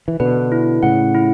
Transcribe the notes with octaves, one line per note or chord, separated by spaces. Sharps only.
E3
B2 D3 B4
E4
A2 C#3 F#5
E4